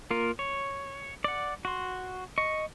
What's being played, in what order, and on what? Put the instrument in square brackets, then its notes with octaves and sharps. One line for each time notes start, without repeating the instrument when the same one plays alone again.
[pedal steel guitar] A#3 F4 A#4
C#5
D5 F#5
F#4 C6
D#5 C#6